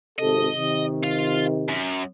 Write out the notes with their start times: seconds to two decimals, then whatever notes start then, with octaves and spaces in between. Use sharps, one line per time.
0.19 G#1 C3 A4 D#5
0.56 C3 D#3
1.03 F4 F5
1.68 F#2